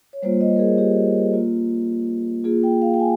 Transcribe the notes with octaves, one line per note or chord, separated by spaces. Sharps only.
C#5
G3 A#3 F4 C5
D#5
A#4
G#4
G4
A#3 F4
A#3 F4 G#4
G5
F5
G5
G#5